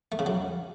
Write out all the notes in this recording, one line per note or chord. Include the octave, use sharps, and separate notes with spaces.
A3
C#3
F#3